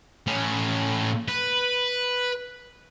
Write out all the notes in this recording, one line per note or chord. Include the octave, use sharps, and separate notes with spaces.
A2 C#4
B4